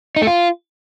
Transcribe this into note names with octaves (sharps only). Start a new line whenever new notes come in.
D#4
A3
F4